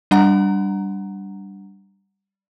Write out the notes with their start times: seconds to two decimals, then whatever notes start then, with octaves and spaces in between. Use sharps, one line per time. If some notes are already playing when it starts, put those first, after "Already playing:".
0.11 G3 D4 F#5 A#5